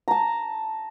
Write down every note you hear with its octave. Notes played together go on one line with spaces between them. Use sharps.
A5 A#5